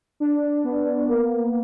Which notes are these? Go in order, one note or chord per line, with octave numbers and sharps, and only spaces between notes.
D4
B3
A#3